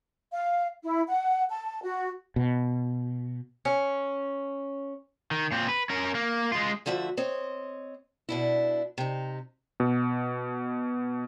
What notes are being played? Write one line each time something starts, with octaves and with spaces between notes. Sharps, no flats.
F5
E4
F#5
A5
F#4
B2
C#4
D#3
A#2 C4
B4
C#4 A#4
A#3
G#3 F4
D3 F3 A3 F#4 E5
C4 C#5 D#5
B2 D4 E4
C3 D#4
B2